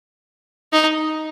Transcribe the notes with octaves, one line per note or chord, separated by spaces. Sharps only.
D#4